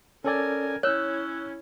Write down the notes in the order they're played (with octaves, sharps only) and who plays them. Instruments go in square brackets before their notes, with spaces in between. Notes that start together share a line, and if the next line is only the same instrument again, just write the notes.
[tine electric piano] C#4 A4 D5 [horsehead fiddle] A#4 G#5
[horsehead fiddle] C#4 E4 [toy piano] C#5 [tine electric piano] E6 F#6